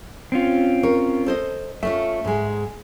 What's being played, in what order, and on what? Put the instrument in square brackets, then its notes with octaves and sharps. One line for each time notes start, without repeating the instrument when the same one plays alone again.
[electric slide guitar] C4 C#4 F4
[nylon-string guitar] A#4 C#5
A4 C5 D#5
[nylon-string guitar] A3 C#4 F4 [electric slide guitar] E5
[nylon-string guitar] G#2 G#3